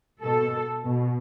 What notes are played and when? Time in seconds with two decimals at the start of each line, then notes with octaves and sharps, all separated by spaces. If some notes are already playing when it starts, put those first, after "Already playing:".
0.23 B2 A4
0.85 B2